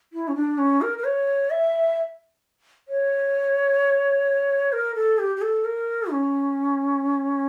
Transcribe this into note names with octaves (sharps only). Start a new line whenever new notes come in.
E4
C#4
D4
C#4
A#4
A#4
C#5
E5
C#5
A#4
A4
G4
G4
A4
A#4
C#4